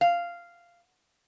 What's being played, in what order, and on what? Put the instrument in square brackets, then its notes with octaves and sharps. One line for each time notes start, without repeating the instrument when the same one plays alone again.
[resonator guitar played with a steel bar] F5